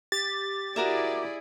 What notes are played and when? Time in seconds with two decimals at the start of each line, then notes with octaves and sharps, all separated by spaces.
0.12 G4 A6
0.76 E4 F#4 G#4 A#4 D5 E5